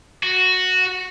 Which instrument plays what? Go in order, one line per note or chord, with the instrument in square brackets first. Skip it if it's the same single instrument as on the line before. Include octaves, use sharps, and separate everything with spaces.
[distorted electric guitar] F#4